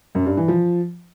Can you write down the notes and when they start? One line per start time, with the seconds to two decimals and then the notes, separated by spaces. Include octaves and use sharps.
0.15 F#2
0.26 G2
0.37 E3
0.48 F3